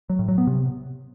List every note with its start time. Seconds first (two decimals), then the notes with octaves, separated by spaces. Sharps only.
0.10 F#3
0.19 A2
0.28 F#3
0.38 B3
0.47 C3